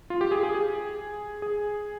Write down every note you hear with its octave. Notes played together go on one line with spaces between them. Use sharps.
F4
G4
G#4
G#4
G#4
G#4